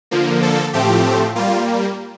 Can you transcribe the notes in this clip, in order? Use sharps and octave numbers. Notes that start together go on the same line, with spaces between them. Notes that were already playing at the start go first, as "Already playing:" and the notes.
D3 F3 A#3
A4
A2 F3 A3 C4 G4
G3 A#3 F4